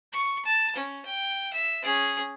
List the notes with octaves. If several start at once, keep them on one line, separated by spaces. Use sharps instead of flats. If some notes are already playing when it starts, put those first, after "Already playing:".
C#6
A5
C#4
G5
E5
C#4 G#4